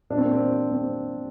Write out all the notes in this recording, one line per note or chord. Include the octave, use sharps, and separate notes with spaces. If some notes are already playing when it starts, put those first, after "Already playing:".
A#2 D4
C4
A#3
C4
C4